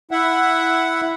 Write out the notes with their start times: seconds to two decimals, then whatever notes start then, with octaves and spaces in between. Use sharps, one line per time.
0.11 E4 E5 F#5